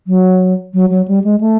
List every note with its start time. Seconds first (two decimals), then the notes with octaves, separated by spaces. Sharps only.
0.07 F#3
0.74 F#3
0.90 F#3
1.08 G3
1.24 G#3
1.40 A3